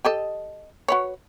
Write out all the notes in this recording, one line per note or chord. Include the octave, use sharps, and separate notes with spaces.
G4 A4 D#5
F#4 B4 C#5